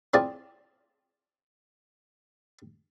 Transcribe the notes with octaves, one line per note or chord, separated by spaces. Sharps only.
C4 E4 F4 G#4 D5 A5